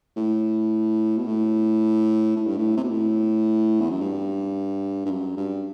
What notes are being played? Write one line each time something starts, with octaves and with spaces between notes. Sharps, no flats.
A2
B2
A2
A2
G2
A2
C3
B2
A2
E2
F#2
G2
G2
F#2
G2